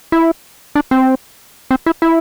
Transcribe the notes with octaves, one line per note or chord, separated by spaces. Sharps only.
E4
D4
C4
C4
E4
E4